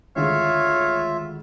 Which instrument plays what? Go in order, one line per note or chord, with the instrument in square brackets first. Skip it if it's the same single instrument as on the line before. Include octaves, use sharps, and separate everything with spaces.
[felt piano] G#1 D2 G#4 [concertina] F4 E5 [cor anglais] C#5 [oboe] F5